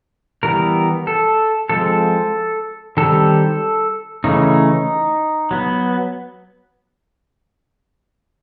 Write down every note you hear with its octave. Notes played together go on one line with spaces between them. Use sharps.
E3 G3 B3 A#4
A4
F3 G#3 C4 A4
D#3 G3 C4 A4
C#3 E3 A3 C#4 D#4
F#3 B3